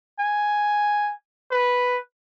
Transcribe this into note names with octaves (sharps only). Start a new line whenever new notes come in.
G#5
B4